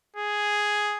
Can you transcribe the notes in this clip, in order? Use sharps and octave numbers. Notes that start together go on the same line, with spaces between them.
G#4